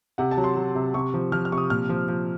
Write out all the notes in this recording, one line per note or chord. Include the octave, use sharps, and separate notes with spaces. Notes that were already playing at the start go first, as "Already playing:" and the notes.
C3 F#5
A5
F#3
C6
F#3
C3
C3 C#6
F3
F3 F6
F6
C3 C#6
D#6
A#2 F6
F3
F3